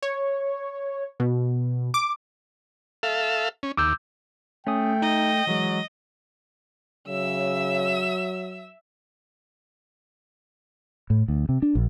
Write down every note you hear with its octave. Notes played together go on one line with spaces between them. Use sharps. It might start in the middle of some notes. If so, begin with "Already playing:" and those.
C#5
B2
D6
A4 E5 F5
C#4
D#2 D6 E6 G6
A3 C#4 G5 G#5 D#6
D#4 D#5
E3 F#3 G#3
C#3 F#3 E5 E6
A2
D2
C3
D4
A#1